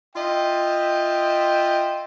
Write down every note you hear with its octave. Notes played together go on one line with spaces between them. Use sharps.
F4 D#5 E5 G5